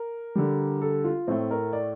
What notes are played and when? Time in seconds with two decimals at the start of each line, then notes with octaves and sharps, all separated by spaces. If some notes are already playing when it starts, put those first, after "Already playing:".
Already playing: A#4
0.35 D3 G3
0.82 A4
1.04 F4
1.27 A2 A3 C4
1.51 A#4
1.73 D5